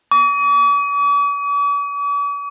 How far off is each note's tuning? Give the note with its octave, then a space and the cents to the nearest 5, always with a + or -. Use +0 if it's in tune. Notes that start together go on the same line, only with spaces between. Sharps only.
D6 -45